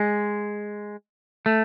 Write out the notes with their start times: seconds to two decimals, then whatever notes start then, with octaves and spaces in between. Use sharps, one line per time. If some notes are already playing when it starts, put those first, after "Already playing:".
Already playing: G#3
1.46 A3